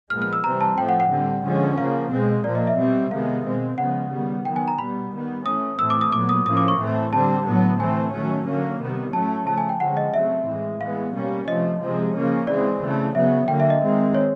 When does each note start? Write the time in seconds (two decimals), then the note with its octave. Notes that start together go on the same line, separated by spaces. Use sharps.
0.10 A#2 F3 G#3 B3 F6
0.22 F6
0.33 E6
0.44 C3 E3 G3 C4 A#5
0.61 A5
0.77 A2 F3 A3 G5
0.89 F#5
1.00 F#5
1.11 D3 G3 C4
1.44 D3 F3 G#3 C#4
1.78 C#3 F3 A#3 F5
2.12 B2 G#3 C4
2.44 A#2 F3 A#3 D5
2.55 D#5
2.67 E5
2.78 B2 G3 C4
3.11 C3 D#3 G#3 B3 F5
3.45 B2 G#3 C4
3.78 C#3 F3 G#3 B3 F#5
4.12 D#3 G3 B3
4.45 D#3 F#3 B3 G5
4.56 G#5
4.68 A#5
4.78 B2 G3 B3 B5
5.13 D#3 G3 B3
5.45 E3 A3 C#4 D#6
5.78 A2 E3 A3 C4 E6
5.90 D6
6.01 D#6
6.12 A#2 F#3 B3 D6
6.29 D#6
6.46 A2 F3 A#3 C#4 D#6
6.57 D6
6.68 C#6
6.79 A2 E3 A3 C4
7.12 D3 G3 C4 A5
7.46 A2 F#3 B3
7.80 E3 A3 C4 G#5
8.13 D#3 F#3 A3 C#4
8.46 D3 F#3 A#3 C#4
8.80 C3 D#3 G3 B3
9.13 A2 F#3 A3 C#4 A5
9.47 C#3 F3 A3 A5
9.58 G#5
9.69 G5
9.80 D3 F3 G#3 C#4 F#5
9.97 D#5
10.14 C#3 F#3 A3 C4 E5
10.47 A2 E3 G#3
10.81 E3 G#3 B3 F5
11.14 B2 G3 A#3 C#4
11.47 C3 F3 A3 D#5
11.81 C3 F3 G#3 C4
12.15 C#3 F3 A#3 C#4
12.47 C#3 E3 G#3 C4 D5
12.82 C#3 E3 A3
13.14 C#3 F#3 B3 E5
13.48 D3 F#3 A#3 G5
13.60 E5
13.70 D#5
13.81 D#3 G#3 C4
14.14 C#5